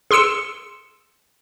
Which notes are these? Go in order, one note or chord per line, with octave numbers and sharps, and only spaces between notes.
G#4 C6 E6 C#7 E7